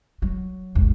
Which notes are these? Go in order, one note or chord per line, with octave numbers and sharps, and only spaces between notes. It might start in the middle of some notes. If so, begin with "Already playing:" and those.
F#3
G#1 D#2